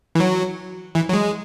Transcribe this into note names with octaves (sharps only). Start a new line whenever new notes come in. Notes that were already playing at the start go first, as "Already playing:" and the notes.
E3
F#3
E3
F#3
G#3